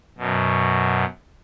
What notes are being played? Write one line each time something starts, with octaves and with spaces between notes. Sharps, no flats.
F#2 B2